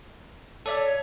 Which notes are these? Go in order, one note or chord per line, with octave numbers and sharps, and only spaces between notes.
A4 C#5 D5 E5